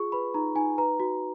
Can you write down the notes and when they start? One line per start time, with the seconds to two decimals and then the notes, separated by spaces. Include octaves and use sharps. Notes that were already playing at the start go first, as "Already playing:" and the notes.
Already playing: F4 G#4 C#6
0.12 B4 B5
0.34 D#4 A#5
0.55 D#4 G#5
0.78 B4 A#5
1.00 F#4